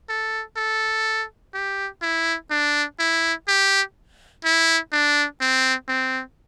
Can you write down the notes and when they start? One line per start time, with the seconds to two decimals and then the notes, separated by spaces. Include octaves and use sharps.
0.09 A4
0.57 A4
1.54 G4
2.02 E4
2.50 D4
2.99 E4
3.48 G4
4.44 E4
4.92 D4
5.41 C4
5.88 C4